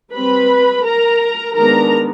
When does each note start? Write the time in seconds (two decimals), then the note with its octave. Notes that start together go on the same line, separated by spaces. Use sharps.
0.14 G3 C4 B4 B5
0.85 A#4 A#5
1.56 D#3 G#3 B3 D4 A#4 A#5